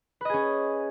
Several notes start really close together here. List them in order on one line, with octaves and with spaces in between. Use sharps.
B4 D#5 G#4 C#4